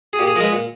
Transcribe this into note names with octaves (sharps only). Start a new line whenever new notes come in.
G#4
A#2 G4
G#4
F3 G#3 A#4 B4
A#2